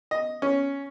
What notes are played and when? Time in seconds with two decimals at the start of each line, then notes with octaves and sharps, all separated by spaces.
0.11 D#5
0.42 C#4